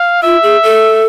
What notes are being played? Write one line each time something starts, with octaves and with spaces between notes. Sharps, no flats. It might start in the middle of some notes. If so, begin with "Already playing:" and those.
Already playing: F5
F4 E5
G#4
A4